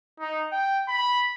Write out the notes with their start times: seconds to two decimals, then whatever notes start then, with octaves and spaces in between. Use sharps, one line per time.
0.20 D#4
0.52 G5
0.88 B5